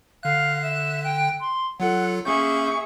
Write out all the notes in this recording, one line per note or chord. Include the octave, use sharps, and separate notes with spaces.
D3 F5 F#6
E5
G5
C6
F#3 F4 A4 F#5
A#3 C#4 G#4 E5 C#6 G6